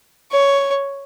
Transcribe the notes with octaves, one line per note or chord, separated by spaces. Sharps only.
C#5